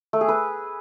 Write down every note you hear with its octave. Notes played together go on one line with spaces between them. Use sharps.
A3
G#4
B4